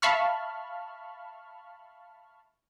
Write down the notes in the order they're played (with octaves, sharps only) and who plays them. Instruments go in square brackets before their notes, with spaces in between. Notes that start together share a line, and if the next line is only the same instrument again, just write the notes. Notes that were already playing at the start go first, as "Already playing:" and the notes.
[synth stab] E5 F5 A5 B5 C#6 F6